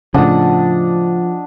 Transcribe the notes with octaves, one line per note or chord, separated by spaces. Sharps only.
A2 C#3 F3 D4 D#5 F#5